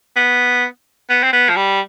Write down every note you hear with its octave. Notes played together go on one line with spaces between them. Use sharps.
B3
B3
C4
B3
F3
G3